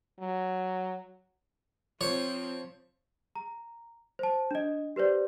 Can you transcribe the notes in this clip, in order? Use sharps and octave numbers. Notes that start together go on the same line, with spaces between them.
F#3
F3 C4 F4 C5 C#5
A#5
C5 A5
D4 D#5
G4 B4 C5 D5